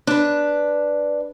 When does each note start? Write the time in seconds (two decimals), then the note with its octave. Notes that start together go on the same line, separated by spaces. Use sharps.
0.07 D4 B4